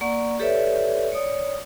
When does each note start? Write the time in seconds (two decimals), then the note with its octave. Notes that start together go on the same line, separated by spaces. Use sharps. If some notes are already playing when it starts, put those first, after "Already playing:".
0.01 A#3 D5 F#5 C#6
0.39 G4 A4 B4 C#5 D5 E5
1.12 C#5 D5 D#6